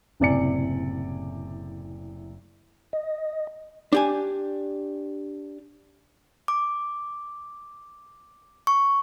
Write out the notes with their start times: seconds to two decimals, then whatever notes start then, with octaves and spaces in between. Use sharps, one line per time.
0.20 F#1 A2 C3 D5 G#5 C#7
2.93 D#5
3.92 D4 G4 G#5
6.48 D6
8.67 C#6